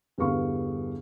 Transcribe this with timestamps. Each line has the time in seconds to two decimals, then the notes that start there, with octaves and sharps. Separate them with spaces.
0.18 E2 G2 D3 G3 F5 C#6